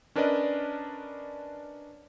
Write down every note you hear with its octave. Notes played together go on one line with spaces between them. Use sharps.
C#4 D4 A#4 B4 D5 D#5